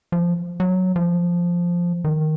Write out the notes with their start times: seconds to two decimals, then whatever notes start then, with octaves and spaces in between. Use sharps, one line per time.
0.12 F3
0.60 F#3
0.96 F3
2.04 D#3